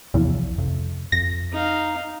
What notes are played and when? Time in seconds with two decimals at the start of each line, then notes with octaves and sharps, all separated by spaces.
0.14 B1 E2 C3 F3
0.58 F2 C3
1.12 F2 A#6
1.52 D#4 F5